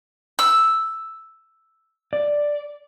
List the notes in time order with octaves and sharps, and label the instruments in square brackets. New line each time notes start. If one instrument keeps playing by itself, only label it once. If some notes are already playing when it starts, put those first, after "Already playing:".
[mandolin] E6
[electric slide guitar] D5